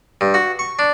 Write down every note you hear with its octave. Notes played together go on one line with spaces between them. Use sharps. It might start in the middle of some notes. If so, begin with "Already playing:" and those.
G2
F#4
C#6
D4